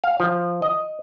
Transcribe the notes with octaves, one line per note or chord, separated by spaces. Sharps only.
F5
F3
D#5